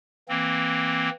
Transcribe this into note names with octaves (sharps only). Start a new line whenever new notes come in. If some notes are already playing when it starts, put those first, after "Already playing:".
E3 A#3 C4